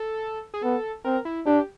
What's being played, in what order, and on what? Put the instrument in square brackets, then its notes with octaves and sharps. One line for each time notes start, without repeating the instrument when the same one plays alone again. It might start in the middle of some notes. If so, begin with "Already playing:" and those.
Already playing: [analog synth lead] A4
G#4
[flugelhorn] B3 [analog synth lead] A4
[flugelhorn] C4 [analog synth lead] A#4
[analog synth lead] E4
[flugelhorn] D4 [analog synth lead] G4